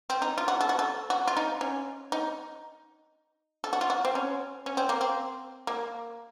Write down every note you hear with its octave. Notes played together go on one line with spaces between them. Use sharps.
C4
D#4
F4
F#4
A4
F#4
A4
F#4
F4
D#4
C#4
D#4
A4
F#4
F4
F#4
C4
C#4
C#4
C4
A#3
C4
A#3